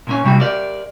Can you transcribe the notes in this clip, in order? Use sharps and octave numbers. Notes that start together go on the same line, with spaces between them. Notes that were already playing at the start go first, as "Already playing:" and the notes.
A#2 A#3 C#4
C3 G3 A#3 F#4
G4 A#4 D5